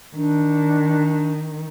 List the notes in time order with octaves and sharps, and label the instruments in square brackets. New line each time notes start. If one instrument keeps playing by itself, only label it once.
[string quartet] D#3 [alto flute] D4